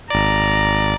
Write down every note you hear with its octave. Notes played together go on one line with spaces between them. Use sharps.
G#1 D5 A#5